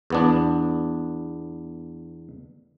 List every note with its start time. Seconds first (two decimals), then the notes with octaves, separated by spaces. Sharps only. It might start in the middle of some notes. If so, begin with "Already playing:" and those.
0.10 E2 B3 D4